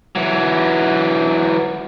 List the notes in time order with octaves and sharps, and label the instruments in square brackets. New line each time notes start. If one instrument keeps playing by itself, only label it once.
[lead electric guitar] E3 F#3